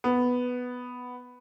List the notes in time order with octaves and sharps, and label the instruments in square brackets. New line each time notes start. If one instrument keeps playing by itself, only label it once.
[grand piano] B3